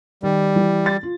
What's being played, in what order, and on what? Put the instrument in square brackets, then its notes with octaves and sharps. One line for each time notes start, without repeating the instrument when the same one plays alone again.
[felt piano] D#3 [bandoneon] G3
[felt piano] E3
A6
F4